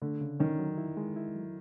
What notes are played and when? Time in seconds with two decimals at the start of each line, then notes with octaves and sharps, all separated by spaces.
0.02 D3 A3
0.21 C#3
0.40 D#3 C#4
0.59 F#3
0.78 E4
0.97 G#3
1.16 E4
1.35 F#3